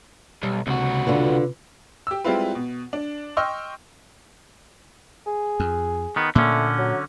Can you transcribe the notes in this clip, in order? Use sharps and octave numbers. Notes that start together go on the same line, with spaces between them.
B1 G3
C#2 C3 F#4
D3 F4 B4
G4 E6
G3 G#3 C4 E4 F4 B4
B2
D4
D#5 G5 C6 C#6 E6 F6
G#4
F2
D#3 B3
A#2 D3 A3 A#3 C#4
F#3